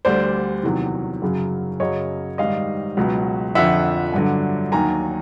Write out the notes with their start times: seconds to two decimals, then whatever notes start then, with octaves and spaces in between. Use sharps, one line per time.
0.05 D2 D3 G3 C5 D5
0.63 E2 C3 D#3 F#3
1.22 F#2 C#3 F#3
1.80 F#2 C#3 F#3 C#5 D#5
2.38 G#2 D#3 G3 D#5 F5
2.97 C#2 B2 F#3
3.55 F2 D3 F3 E5 F#5
4.14 G2 D3 F#3
4.72 D#2 D#3 F#3 G#5 A#5